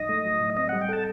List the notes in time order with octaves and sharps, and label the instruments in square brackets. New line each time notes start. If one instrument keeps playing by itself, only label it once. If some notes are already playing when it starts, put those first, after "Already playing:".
Already playing: [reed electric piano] A2 F#3 D#4 [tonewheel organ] D#5
[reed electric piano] A3
F#3
A2
[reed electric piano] C4 [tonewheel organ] D#5
[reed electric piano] G3 [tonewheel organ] F#5
[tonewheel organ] G5
[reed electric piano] A4 [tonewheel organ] A5